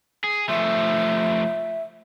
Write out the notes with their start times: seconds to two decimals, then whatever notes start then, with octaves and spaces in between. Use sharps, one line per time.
0.24 G#4
0.49 F3 A3 E5